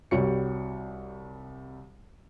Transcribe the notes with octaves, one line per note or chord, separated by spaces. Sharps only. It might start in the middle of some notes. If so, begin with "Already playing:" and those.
C2 G3 F#4 C#5 C#7